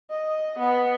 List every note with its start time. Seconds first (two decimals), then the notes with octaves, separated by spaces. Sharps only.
0.11 D#5
0.59 B3